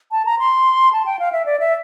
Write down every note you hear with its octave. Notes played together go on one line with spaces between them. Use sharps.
A5
A#5
C6
A5
G5
F5
E5
D5
E5